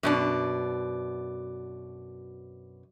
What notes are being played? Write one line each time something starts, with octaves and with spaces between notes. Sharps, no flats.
F#2 B2 D4